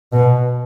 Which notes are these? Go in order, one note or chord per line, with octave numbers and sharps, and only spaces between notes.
B2